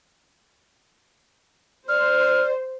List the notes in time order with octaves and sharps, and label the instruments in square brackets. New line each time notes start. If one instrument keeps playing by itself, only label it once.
[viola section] C5 [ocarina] D5 [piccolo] F6